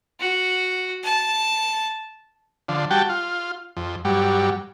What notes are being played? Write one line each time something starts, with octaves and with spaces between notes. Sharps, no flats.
F#4
A5
D3 F3
G3 F#4 G5 A5
F4
F2
G2 F#3 G3